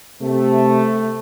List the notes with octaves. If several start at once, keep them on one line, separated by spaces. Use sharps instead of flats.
C3 A3